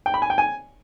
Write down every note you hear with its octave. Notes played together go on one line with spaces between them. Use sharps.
G5
B5
G#5
G5
G#5